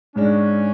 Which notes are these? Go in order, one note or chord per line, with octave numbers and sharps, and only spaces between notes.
G#2 G#3 C#4 D4